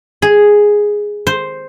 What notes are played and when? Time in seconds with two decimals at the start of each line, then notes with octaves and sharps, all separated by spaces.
0.22 G#4
1.27 C5